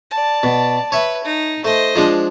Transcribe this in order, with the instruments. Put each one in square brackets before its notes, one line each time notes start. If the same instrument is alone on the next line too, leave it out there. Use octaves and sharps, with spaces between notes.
[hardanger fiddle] D5 A5
[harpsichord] B2
[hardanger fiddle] B4 [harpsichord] C#5 E5
[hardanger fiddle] D#4
[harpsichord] A3 [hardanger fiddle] C5 D#5
[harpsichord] F3 G#3 D4